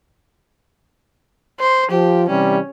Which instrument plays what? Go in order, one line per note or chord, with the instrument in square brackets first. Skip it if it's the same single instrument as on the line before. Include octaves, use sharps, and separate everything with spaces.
[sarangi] C5
[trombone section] F3 [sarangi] G4
[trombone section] C3 E3 G3 [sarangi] C#4